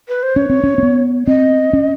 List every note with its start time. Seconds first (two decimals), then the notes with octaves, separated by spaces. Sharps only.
0.09 B4
0.23 C5
0.36 C#4 C#5
0.50 C4
0.64 C#4
0.78 C4
0.83 B3
1.27 C4 D#5
1.73 C#4